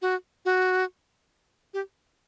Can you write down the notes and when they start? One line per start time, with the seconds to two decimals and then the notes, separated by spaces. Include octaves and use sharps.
0.02 F#4
0.45 F#4
1.74 G4